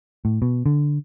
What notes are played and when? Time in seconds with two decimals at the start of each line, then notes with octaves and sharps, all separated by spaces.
0.25 A2
0.42 B2
0.66 D3